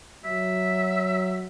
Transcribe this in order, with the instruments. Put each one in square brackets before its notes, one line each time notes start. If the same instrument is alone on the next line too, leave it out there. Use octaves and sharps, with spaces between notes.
[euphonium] F#3 [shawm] E5